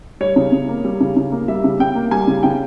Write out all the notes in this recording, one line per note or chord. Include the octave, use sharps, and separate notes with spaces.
G3 C#5
C#3
C#3
A#3
G3
C#3
C#3
A#3
G3 E5
C#3
C#3 G5
A#3
G3 G#5
C#3
C#3 G5